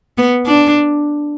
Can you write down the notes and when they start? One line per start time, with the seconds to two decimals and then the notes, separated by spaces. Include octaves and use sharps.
0.18 B3
0.46 D4